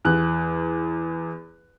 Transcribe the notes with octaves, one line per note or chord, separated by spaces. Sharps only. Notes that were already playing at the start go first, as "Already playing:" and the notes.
E2 F#6